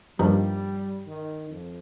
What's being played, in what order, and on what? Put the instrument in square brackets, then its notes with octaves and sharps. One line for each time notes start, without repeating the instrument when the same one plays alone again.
[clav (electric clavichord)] G2 F3 A#3 D#4 G4 [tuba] G3
[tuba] D#3
F2